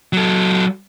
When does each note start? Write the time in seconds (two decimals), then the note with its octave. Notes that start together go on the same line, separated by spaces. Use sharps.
0.13 F#3 A4